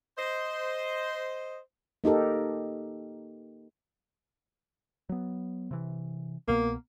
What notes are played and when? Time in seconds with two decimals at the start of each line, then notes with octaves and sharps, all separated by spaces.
0.17 C5 D#5
2.04 A#3 D#4 G4 A4 A#4
5.09 F#3 B3
5.71 C3 E3
6.48 C2 B2 A#3 B3